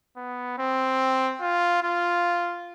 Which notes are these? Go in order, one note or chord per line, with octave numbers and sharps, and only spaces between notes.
B3
C4
F4
F4